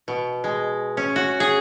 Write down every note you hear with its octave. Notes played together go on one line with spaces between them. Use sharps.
B2
G#3
C#4
F#4
G#4